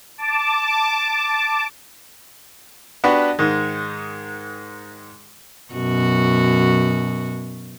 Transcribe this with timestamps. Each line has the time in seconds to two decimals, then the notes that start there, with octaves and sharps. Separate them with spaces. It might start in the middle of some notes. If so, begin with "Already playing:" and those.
0.18 A5 D6
3.04 B3 D4 F#4 G4 B4
3.39 G#2 D#3 G#3
5.74 F#2 B2 F#4